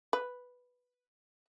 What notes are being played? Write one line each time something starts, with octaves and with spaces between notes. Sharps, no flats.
B4